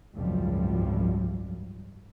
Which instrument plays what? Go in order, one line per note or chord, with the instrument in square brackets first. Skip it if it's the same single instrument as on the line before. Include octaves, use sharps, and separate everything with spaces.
[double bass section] G#1 C#2 F#2 F3 G3